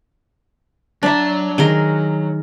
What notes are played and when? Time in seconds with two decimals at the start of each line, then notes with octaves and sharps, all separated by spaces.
1.03 F#3 D4 E5 A#5
1.58 D#3 G#4 A#4